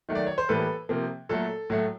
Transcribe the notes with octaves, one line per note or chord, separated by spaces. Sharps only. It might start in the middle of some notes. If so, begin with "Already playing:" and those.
D#3 F#3 A3
D5
C#5
C5
A2 E3 G3 A#3 A4 B4
C3 F3 A#3
A#2 F#3 A3 A4
A2 F#3 A3